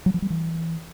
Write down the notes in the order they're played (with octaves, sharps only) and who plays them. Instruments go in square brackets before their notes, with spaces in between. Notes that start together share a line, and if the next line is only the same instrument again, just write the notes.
[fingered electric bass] F#3
F3
G3
E3